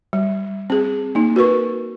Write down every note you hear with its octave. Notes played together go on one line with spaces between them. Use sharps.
G3
C4 G#4
A#3 D#4
F#4 A#4 B4 C#6